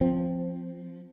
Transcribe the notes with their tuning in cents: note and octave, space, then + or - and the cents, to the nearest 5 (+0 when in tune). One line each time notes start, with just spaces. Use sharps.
F3 +0 C4 +0